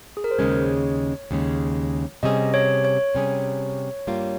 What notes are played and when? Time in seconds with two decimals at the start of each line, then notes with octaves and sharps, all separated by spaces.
0.17 G#4
0.24 A#4
0.31 C5
0.38 D#2 C#3 G#3 C#4 C#5
1.31 D#2 C#3 G#3 C#4
2.23 C3 G3 C#4 G#4 D#5
2.54 C#5
2.85 C#5
3.15 C3 G3 C#4 G#4
4.07 G2 G3 A#3 F4